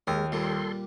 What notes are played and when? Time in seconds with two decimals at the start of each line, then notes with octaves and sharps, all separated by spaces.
0.07 D#2 G#3 A#4
0.32 A#2 G3 A4 C6